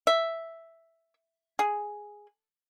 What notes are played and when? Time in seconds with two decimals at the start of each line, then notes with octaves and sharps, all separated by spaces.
0.07 E5
1.59 G#4